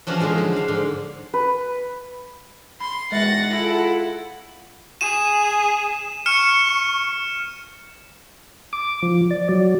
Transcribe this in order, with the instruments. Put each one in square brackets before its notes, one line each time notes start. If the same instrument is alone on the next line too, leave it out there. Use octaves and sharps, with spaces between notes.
[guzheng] E3 F3 C#4 D4 F#4 A#4
D3 D#3 F3 G#3 C5
F#3
D4 F5
G#2 D3
[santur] B4
[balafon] B5 [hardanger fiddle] C6
[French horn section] E2 B2 D#3 [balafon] G#3 E5 [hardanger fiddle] F#5 [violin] A6 A#6
[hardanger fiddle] E4 [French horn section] F4 G#4 A4 [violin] F#5
[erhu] G#4 [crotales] D#7 E7
[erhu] C#6 [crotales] F6 C#7 E7
[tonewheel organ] D6
F3
D5
F#3